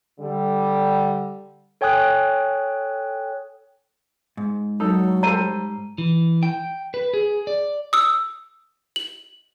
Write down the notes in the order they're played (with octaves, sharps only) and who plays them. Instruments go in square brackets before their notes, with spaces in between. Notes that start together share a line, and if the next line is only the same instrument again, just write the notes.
[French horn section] D3 G3
[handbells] A4 C#5 G5 G#5 D#6 F#6
[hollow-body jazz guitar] G#2
[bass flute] F#3 [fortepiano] D#4 A4
[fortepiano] G3 A4 C5 [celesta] A#5 D#7
[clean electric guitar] E3
G5
B4
G#4
D5
[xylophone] D#6 E6
F#7